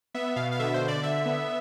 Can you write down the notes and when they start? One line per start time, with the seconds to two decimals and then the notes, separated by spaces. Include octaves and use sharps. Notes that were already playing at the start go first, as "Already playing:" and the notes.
0.14 B3 E5
0.36 B2 F5
0.52 F5
0.59 D3 E5
0.74 C5
0.81 D3
0.88 D5
1.03 D3 E5
1.25 B3